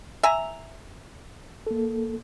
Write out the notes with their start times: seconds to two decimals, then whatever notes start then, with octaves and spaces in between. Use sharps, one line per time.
0.23 E5 G#5 A#5
1.67 A#3 A4